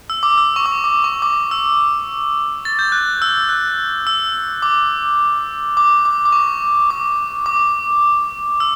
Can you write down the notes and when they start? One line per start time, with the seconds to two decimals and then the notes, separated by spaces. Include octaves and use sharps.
0.10 E6
0.23 D6
0.38 E6
0.56 C#6
0.66 D6
0.84 D6
1.04 C#6
1.22 D6
1.51 E6
2.65 A6
2.79 G6
2.92 F#6
3.22 E6
3.49 F#6
4.07 E6
4.62 D6
5.77 D6
6.05 D6
6.25 D6
6.32 C#6
6.90 D6
7.46 D6
8.60 E6